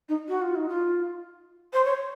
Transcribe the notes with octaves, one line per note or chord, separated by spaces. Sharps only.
D#4
F#4
F4
D#4
F4
C5
C#5